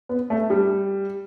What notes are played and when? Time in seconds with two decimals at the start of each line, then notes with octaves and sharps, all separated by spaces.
0.09 B3
0.30 A3
0.50 G3